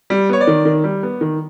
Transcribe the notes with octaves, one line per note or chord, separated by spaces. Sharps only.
G3
B3 C#5
D5
D#3
D#3
G3
B3
D#3